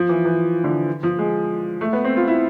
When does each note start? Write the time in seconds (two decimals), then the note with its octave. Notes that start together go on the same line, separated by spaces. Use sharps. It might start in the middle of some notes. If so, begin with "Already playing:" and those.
Already playing: F3
0.09 E3
0.25 E3
0.64 D3
1.03 F3
1.19 G#3
1.81 A3
1.93 B3
2.04 C4
2.17 F4
2.27 E4